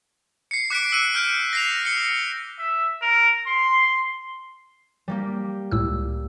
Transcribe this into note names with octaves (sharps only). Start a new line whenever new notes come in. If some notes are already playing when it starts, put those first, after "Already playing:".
C7 C#7
D6 F#6 B6 C#7 D7
E6 F#6 D#7
F6 G6 D7
A#6 C7 F7
C#7 G7
E5
A#4
C6
G3 A#3 G4
C#2 A2 E6